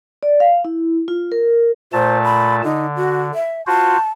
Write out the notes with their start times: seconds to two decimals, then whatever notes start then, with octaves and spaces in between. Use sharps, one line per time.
0.23 D5
0.40 F5
0.65 E4
1.08 F4
1.32 A#4
1.93 A#2 A3 C5 A5
2.24 B5
2.64 D3 D#4
2.96 F#4
3.34 E5
3.67 F4 F#4 C5 A5